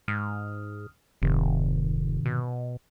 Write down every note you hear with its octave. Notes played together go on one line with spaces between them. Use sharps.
G#2 D#6 F6
F1 G#2 C3 D#3
B2